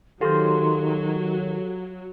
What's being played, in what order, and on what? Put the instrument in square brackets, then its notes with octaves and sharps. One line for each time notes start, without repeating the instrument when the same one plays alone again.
[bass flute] D#3 [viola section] F#3 [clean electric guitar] F4 C5 [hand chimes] G4 A4